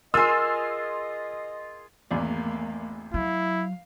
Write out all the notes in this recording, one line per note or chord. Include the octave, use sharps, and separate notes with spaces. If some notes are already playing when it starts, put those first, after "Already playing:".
F4 G#4 A#4 D#5 G#5 C6 E6
G#1 E2 A3 A#3 D5
F#3 E4 F5